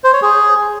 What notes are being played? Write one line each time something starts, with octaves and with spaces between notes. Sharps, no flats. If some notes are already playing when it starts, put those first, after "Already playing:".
C5
C#5
G#4